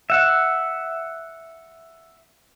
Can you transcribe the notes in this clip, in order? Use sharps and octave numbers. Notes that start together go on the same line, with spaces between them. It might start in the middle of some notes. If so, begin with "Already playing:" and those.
E5 F#5